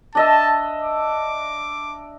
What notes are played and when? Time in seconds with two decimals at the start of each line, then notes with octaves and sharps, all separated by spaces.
0.15 D4 D#5 E5 A5
0.82 D6